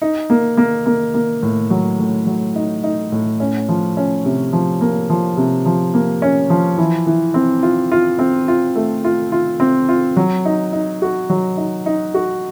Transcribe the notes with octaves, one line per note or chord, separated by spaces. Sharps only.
D#4
A#3
A#3
A#3
A#3
A2
F#3
A2
F#3
D#4
D#4
A2
C#4
F3
C#4
C3
F3
A#3
F3
C3
F3
A#3
C#4
F3
E3
E3
C4
F4
F4
C4
F4
A3
F4
F4
C4
F4
F#3
D#4
D#4
F#4
F#3
D#4
D#4
F#4